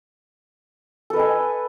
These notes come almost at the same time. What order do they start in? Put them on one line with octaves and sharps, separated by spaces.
A4 B4 D#5 G#5